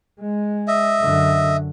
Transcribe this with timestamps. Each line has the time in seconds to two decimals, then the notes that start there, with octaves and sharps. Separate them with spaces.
0.20 G#3
0.68 D#5 E5
1.00 F#2 D3